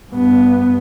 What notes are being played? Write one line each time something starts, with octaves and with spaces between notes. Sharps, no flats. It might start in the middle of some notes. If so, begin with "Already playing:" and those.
G2 B3